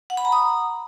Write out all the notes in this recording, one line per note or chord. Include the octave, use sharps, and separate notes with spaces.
F#5
B5
A#5
D#6